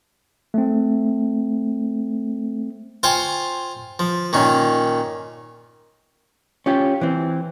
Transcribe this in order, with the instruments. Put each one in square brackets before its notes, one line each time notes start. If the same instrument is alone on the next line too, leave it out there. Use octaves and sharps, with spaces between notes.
[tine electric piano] A3 C4
[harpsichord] F4 C5 G5 G#5 C#6
F3
A#2 D#3 C#4
[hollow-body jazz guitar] C#4 F4 G4
E3 C4